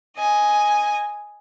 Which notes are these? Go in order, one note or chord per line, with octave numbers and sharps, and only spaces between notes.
D#5 G#5